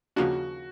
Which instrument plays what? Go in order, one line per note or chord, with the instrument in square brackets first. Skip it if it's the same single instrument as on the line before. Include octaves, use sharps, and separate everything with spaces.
[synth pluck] D#2 C#3 F3 A#3 D4 [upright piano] F#4